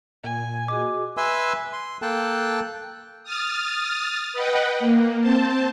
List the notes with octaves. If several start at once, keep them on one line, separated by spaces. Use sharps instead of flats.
A#2 G#5
F#4 G#4 D#5 D6
B4 E5 G#5 C6 E6
C6
A#3 A4 G5 A5 F#6
D#6 F6 A6
B4 D#5 F#5 G5
A#3
C4 C5 A5